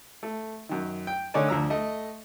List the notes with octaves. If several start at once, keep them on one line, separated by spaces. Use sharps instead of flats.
A3
F#2 D#3
G5
D3 A3 D#4 C#5 D5 G#5
D2 F3 A#5 E6
A3 D#5